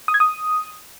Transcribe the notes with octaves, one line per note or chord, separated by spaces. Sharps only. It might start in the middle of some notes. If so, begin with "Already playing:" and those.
D#6
G#6
D#6